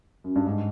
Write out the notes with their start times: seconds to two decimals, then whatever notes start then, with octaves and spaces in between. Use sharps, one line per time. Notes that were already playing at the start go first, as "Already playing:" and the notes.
0.24 F#2
0.36 G2
0.46 G#2